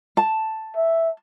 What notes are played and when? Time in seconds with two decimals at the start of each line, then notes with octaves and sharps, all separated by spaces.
0.17 A5
0.76 E5